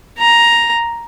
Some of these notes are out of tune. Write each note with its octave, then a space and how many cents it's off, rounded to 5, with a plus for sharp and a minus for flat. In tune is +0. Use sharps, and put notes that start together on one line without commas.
A#5 +5